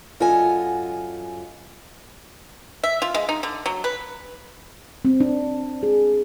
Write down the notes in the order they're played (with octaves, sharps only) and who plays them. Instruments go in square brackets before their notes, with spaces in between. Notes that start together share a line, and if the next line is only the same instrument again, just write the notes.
[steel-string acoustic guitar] F#2 F4 A4 D#5 F#5 G#5
[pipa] E5
F4
G#3
D#4
D3
F#3
B4
[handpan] C4
D4
G#4